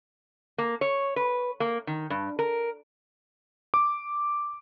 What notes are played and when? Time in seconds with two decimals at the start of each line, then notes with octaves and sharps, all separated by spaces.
0.58 A#3
0.81 C#5
1.16 B4
1.60 A#3
1.87 D#3
2.10 G2
2.39 A#4
3.74 D6